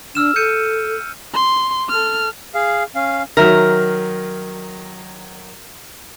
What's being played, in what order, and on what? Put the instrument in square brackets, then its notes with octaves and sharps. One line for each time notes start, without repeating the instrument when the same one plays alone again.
[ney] D4 [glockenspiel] E6 F6 E7
[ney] A4 [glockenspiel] G6 C#7 D#7
[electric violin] C6
A4 F6
[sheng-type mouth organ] G#4 F5
C#4 F5
[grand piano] D#3 F#3 [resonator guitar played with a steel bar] A#4 E5